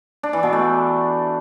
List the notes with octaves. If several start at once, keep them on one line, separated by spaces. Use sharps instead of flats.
D4
E3
B2
A3